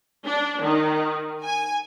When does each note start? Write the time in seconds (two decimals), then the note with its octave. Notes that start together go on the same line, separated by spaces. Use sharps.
0.25 D4
0.62 D#3
1.44 G#5